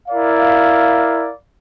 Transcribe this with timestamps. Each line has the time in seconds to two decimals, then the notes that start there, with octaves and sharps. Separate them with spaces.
0.08 E4 A#4 D5 F5